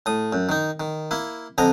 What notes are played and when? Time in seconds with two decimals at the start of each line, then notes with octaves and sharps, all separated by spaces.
0.06 A2 D#6
0.33 F#2
0.49 D#3 D#4
0.80 D#3
1.11 A#3 E4
1.58 F2 D3 D#5 G#5 A#5